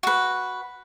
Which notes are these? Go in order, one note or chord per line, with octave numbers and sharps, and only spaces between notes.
F#4 B4